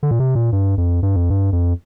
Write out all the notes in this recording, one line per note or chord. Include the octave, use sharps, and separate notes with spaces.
D3
A#2
C3
A#2
G2
F2
G2
F2
G2
F2